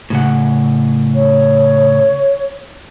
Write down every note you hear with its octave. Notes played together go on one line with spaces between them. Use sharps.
A2 C#3 F#5
C#5